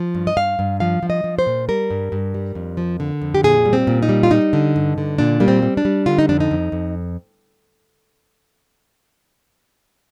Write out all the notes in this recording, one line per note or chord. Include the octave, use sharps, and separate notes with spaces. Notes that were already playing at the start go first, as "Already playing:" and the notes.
Already playing: F3
G2
D#5
G2 F5
G2
F3 F5
F3
D#5
F3
C5
A#2
G3 A#4
G2
G2
G3
F2
F3
D3
F2
G4
A#2 G#4
G3
C4
A#2
D#4
G3
F4
G3 D#4
D3
G2
D3
A#2 D4
G3 A#3
C4
G3
D4
G3
D3 F4
D#4
F2 D4
D#4
F2
F2